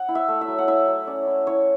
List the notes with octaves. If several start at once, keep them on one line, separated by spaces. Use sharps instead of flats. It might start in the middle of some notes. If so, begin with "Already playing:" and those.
Already playing: F#5
E4
E5
A3
E5
F#3
F#5
E4 E5
F#3
C#4 D5
E4
E4 C#5